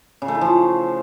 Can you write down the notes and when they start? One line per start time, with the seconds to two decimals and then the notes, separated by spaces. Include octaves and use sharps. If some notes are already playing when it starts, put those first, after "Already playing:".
0.22 C#3
0.28 A3
0.35 E4
0.41 F3